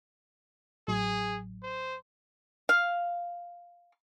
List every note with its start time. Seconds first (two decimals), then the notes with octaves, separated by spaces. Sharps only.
0.88 A1 A2 F#3 G#4
1.63 C5
2.69 F5